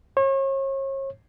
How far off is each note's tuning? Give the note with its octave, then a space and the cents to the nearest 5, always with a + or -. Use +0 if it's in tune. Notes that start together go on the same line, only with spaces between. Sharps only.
C#5 -35